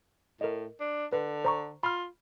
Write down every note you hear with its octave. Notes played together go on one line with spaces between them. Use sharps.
A2 A#4 D#5
D4
D3 B4
C5 A#5 C#6
F4 B5 F6